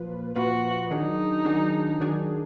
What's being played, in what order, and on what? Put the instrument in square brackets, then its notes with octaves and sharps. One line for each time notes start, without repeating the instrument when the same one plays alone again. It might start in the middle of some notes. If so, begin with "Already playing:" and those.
Already playing: [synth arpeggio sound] A#2 F3 A#3 F4 B4
[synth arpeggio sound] A#2 F3 A#3 F4 B4 [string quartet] F#4
[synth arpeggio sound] D#3 F#3 D4 G#4 [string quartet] D#4
[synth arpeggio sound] D#3 F#3 D4 G#4
D#3 F#3 D4 G#4